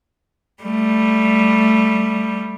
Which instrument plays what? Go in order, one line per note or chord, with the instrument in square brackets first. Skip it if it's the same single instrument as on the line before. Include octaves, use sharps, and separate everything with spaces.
[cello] G3 A3